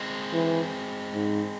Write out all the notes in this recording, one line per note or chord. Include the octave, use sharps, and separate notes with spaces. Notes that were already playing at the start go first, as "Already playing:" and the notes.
Already playing: G#3 C4
E3
G#2